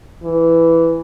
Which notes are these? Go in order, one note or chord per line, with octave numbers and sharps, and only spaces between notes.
E3